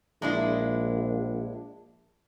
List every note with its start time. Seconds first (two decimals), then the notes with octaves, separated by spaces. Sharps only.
0.22 A#1 G#3 D4 E4